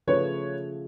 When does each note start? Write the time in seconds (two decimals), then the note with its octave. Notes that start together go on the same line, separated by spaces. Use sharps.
0.07 C#3 F3 A3 B4 C#5